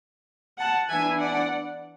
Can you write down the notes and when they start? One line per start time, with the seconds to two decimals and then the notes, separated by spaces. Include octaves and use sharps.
0.59 F#5 A5
0.89 E3 B3 D4 E5 G#5
1.20 D5 F#5